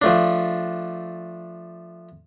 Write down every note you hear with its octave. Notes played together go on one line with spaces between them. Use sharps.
F3 A3 D4